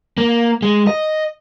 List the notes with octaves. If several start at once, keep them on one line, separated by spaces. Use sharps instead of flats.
A#3
G#3
D#5